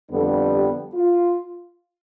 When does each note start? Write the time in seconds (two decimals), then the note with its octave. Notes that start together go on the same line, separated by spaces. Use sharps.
0.10 F2 D3 G3 B3 D4 A4
0.53 G4
0.95 F4